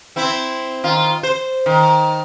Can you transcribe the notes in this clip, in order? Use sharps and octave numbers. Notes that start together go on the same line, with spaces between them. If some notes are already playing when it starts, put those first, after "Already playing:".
C4 E4 C5
D#3 F4
C5
D#3